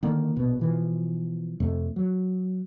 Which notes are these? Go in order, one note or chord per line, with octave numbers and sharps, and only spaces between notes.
D3 D#3 A#3
A#1 B2
B2 E3 F3
F2 C3 A3
F#3